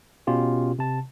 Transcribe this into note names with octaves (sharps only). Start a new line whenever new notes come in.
B2 C#4 F4 G4
C3 A5